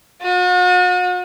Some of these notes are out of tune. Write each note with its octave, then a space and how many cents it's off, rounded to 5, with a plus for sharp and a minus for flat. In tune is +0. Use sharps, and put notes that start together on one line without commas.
F#4 -40